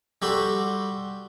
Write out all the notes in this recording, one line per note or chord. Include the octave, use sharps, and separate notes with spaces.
G3 F#4 G4 A4 C6